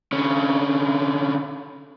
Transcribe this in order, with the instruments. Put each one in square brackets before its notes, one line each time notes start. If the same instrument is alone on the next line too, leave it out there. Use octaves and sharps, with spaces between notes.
[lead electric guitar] D3 C#4